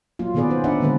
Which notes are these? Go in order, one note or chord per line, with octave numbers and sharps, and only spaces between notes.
F#3 A#3 F4
B2 D#3 B3 G#4 B4 D5
C#4 C5
D4 D#4 B4 D5 E5 F#5
D3 D#3 G#3 A#3 C4 B4